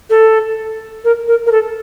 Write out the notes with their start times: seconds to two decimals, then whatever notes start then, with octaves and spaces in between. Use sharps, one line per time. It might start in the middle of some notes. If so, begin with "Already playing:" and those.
0.10 A4
1.05 A#4
1.28 A#4
1.46 A#4
1.52 A4